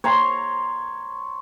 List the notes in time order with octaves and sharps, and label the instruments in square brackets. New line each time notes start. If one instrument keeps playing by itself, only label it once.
[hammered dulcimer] C#5 A#5 C6